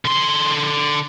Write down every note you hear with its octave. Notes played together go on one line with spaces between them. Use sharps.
D3 C6